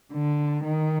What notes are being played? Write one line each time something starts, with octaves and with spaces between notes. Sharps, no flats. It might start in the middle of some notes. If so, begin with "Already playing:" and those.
D3
D#3